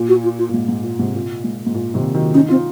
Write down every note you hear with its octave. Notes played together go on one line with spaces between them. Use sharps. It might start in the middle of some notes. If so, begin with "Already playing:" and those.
Already playing: A#2
F#4
F4
F4
A#2
G#2
G#2
A#2
G#2 C3
A#2
G#2
G#2
A#2
C3 D#3
D#3 F#3
C#4 D#4
C4 F4